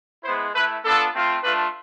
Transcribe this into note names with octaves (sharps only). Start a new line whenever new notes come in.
G#3 B3 E4 C5
A3 E4 B4
B3 D4 F4 A4
A3 C4 F4
A3 D4 F4 B4